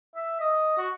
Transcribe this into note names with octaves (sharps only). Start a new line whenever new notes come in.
E5
D#5
F#4